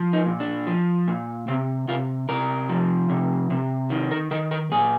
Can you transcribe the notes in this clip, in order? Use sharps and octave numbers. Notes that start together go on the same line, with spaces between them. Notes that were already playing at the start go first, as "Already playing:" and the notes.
Already playing: F3
D#4
A#2
D4
F3
A#2
C3 C4
C3 F4
C3 A#4
F3
C3
C3
D#3
A#4
D#3 A#4
A#4
A#2 G#4